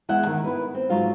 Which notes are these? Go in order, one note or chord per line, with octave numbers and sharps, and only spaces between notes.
E2 G#3 E4 E5 F#5 G5
D#3
B3 E4 B4
C4
G#2 F#3 F4 F5